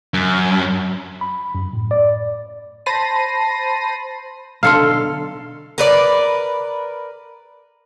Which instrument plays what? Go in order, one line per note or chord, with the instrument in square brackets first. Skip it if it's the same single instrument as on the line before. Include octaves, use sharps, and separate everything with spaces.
[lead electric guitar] F#2
[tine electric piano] B5
F#2
A2
D5
[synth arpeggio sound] C5 A5 B5 A#6 C7 D#7
[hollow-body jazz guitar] B1 D3 C6 [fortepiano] A4 F5
[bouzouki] A#4 B4 D5